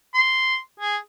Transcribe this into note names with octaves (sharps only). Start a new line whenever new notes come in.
C6
G#4